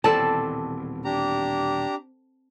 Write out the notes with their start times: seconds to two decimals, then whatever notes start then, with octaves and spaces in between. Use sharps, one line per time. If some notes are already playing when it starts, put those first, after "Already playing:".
0.04 D#1 B2 E3 C4 A4 D5 A5
1.05 D4 G4 A#5